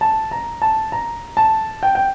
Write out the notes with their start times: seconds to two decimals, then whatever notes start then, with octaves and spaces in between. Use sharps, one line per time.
0.01 A5
0.31 A#5
0.62 A5
0.92 A#5
1.37 A5
1.83 G5
1.95 G5